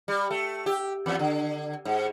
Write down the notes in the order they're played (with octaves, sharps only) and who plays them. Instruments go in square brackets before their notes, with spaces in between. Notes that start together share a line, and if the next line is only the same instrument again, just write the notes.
[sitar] G3
A3
G4
E2
D3
G#2